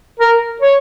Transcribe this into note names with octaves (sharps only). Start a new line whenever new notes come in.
A#4
C#5